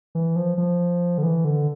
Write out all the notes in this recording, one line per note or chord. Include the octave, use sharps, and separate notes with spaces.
E3
F3
F3
D3
E3
D3